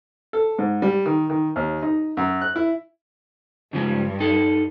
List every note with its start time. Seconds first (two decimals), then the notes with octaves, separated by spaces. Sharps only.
0.33 A4
0.59 G#2
0.82 G3
1.06 D#3
1.30 D#3
1.56 D#2
1.82 D#4
2.17 F#2
2.41 F#6
2.56 E4
3.73 G2 C#3 F3 G#3
4.20 D#4 A4